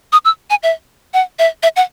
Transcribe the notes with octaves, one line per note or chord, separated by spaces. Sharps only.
D#6
E6
G#5
E5
F#5
E5
E5
F#5